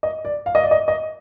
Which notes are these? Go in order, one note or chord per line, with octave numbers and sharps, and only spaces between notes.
D#5
D5
F5
D#5
D5
D#5
D#5